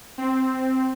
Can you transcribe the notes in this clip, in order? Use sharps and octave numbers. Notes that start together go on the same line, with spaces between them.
C4